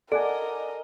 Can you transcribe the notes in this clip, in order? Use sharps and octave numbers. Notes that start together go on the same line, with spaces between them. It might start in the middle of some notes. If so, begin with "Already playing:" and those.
A4 A#4 D5 D#5 F#5 G#5